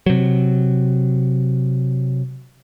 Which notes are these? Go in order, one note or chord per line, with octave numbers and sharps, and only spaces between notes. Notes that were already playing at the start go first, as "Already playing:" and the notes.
C3 F#3